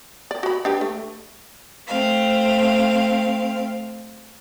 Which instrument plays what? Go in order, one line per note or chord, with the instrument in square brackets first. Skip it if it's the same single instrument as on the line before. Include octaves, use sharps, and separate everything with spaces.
[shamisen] D5
F#4 B5
D4 G4 B4
A3
[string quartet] A3 C4 F5